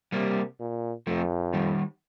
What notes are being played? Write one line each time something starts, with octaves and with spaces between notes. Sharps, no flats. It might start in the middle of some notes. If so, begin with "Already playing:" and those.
C3 G3 A#3
A#2
F2 F3 A3
D#3 G3